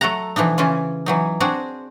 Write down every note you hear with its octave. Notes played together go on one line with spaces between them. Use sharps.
F#3 A3 A4 F#5 A#5
B2 E3 F3 D4 D#4
C#3 E3 C#4 F4
E3 F#3 D#4
C4 D4 F#4 G#4 C5